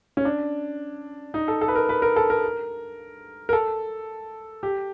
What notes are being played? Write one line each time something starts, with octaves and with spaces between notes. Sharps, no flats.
C#4
D4
D#4
A4
A4
B4
A#4
B4
A#4
A4
A#4
A#4
A4
G4